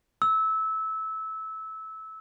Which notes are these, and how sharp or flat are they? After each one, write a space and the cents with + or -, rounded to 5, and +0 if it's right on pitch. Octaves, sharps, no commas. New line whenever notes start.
E6 -20